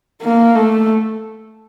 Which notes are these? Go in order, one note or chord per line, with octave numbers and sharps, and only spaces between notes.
A#3
A3